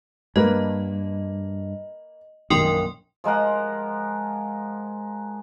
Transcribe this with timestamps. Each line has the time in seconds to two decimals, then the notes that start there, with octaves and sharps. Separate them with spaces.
0.36 G2 A#3 B4 D#5
2.50 A#1 F#2 D#3 A#4 G5 C6
3.24 F3 G#3 A#4 F#5